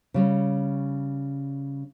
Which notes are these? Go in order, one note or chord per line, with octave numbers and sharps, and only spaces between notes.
C#3 G3 C#4